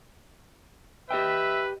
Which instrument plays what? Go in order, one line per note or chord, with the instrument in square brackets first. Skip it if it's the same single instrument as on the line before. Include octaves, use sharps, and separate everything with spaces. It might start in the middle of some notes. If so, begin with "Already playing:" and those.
[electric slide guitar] G4 D#5 G5 [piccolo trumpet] B4 [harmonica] E5